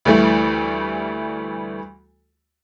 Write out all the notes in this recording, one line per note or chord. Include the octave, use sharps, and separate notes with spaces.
D2 E3 G3 A3